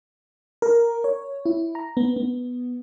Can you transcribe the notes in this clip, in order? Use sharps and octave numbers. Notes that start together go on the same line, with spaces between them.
A#4
C#5
E4
A#5
B3
B3